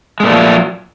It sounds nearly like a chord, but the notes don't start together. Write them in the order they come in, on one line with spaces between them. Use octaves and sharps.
G#3 A#2 A3 F3 F#3